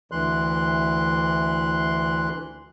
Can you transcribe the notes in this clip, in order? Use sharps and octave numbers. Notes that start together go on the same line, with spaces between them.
D2 E3 C6 F#6